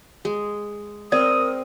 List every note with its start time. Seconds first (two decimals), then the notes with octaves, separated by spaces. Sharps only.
0.25 G#3
1.12 C4 A#4 D5 D#6